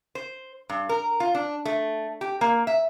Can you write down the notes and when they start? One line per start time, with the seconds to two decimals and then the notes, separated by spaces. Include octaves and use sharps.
0.15 C5
0.69 G2
0.89 A#4
1.20 F4
1.35 D4
1.65 A3
2.21 G4
2.41 A#3
2.67 E5